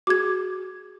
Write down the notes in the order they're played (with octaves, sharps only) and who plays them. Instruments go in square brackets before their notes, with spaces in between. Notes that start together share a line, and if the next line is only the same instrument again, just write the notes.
[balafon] F#4 G#4 [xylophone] D6 G#6